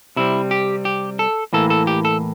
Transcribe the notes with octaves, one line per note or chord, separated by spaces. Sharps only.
C3 G3 C4 E4
G4
G4
A4
A2 E3 A#3 A4
A4
G4
A4